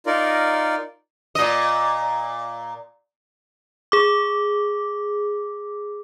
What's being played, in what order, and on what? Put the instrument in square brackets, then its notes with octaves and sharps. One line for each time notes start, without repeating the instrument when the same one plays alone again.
[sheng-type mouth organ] D#4 F4 A#4 D5
[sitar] A#2 D#5
[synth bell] G#4 D6